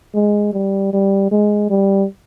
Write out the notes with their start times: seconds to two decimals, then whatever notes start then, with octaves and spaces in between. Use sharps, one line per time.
0.14 G#3
0.53 G3
0.93 G3
1.31 G#3
1.70 G3